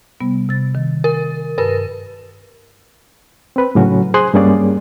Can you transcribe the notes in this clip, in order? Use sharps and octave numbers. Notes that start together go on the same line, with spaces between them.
C3 G3 B3
C3 A6
D#3
A#4
G2 A#4 B4
C4 B4
A2 C#3 F#3 C#4 F#4
G#4 C5 G#5 C6 D#6 F#6
G2 G3 A#3 C#4 G#4 D5